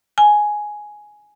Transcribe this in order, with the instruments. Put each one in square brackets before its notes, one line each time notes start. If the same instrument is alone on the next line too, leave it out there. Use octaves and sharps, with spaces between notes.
[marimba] G#5